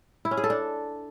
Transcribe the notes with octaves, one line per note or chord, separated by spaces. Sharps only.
E4
C#4
G#4
A4
D4